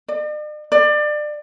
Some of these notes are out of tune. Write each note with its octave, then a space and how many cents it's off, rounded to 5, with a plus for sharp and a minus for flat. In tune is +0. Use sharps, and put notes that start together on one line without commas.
D5 +45
D5 +25